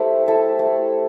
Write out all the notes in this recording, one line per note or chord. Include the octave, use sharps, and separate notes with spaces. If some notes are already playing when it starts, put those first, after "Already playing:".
Already playing: A3 E4 G4 C5
E4 A4 E5
A3